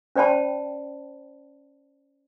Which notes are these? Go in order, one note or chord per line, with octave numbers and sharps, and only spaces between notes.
C#4 C5 D5 G5 A5 B5